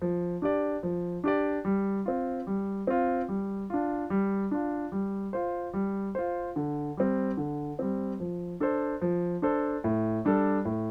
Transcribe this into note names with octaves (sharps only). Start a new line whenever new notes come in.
F3
D4 G4 D5
F3
D4 G4 D5
G3
C4 F4
G3
C4 F4
G3
D4 F4
G3
D4 F4
G3
F4 C5
G3
F4 C5
D3
G3 C4
D3
G3 C4
F3
D4 A4 C5
F3
D4 A4 C5
A2
G3 D4 A4
A2